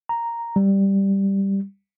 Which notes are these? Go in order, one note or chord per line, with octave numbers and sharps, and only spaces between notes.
A#5
G3